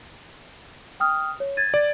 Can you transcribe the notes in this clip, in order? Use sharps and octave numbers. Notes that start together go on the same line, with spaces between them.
G5 D#6 F6
C#5
G#6 A6 D#7
D5